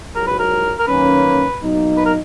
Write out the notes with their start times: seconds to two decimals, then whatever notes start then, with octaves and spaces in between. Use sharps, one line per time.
0.14 A#1 G#2 F#3 A#4
0.27 B4
0.39 A#4
0.79 A#4
0.87 F#2 D#3 A#3 C#4 B4
1.60 B2 F#3 A#3 D#4
1.97 B4
2.06 A#4